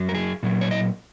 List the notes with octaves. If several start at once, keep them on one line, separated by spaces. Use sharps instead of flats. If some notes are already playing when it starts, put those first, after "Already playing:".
Already playing: F#2 F#3
A#4
G#4
A#2 F#3
C#5
D#5